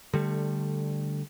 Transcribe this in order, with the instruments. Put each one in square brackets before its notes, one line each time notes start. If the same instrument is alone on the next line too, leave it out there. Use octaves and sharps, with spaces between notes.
[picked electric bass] D3 G3 A3